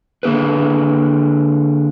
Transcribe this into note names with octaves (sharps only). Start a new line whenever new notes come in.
D3 A#3 G#4 B4